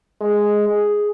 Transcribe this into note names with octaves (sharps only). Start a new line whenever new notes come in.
G#3
G#4